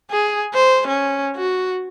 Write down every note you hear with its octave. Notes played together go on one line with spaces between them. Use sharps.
G#4
C5
C#4
F#4